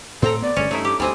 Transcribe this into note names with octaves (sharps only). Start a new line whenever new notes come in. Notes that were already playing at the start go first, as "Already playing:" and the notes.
A2 C4 A4 G5 A#5
B3 D5
G1 G#3 C#4
G2 A3 D#4 E4
G4 D6
D2 G3 C4 D#5 G#5